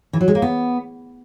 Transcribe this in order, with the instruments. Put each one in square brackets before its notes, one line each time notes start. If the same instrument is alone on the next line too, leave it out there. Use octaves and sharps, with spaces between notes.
[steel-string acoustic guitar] E3
F#3
G#3
A#3
B3